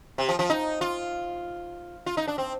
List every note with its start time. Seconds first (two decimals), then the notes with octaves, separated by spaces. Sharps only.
0.18 C3
0.29 F3
0.39 F3
0.50 D#4
0.81 F4
2.06 F4
2.17 D#4
2.28 D4
2.38 C4